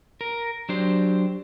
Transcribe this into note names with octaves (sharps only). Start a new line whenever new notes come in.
A#4
F#3 D4 G4 C5